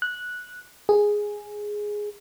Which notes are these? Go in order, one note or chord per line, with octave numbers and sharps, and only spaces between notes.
F#6
G#4